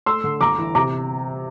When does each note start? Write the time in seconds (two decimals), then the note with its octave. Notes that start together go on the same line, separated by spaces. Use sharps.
0.06 A3 C6 E6
0.24 D3
0.41 G1 A#5 D6
0.58 E3
0.75 C3 A#5 D6